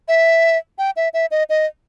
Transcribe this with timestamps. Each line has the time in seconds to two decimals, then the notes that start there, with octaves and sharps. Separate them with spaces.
0.08 E5
0.78 G5
0.96 E5
1.14 E5
1.31 D#5
1.49 D#5